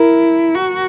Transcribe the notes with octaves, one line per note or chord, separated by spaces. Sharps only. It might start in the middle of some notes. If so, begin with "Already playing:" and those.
Already playing: E4 A#4
F#4